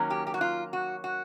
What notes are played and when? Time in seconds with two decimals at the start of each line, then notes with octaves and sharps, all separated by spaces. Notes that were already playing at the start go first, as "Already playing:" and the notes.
Already playing: D#3 F#3 A#3 C#4
0.10 G4
0.27 G4
0.34 F#4
0.41 F4
0.73 F#4
1.04 F#4